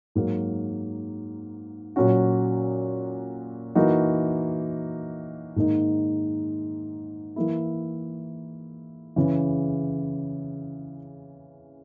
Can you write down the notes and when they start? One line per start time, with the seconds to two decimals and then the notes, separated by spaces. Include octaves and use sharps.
0.15 G#2 F#3 A#3
1.96 A#2 F#3 C#4 F#4
3.75 E3 A#3 D#4 F#4
5.56 G#2 D#3 A#3 D#4
7.36 E3 A#3 E4
9.16 C#3 E3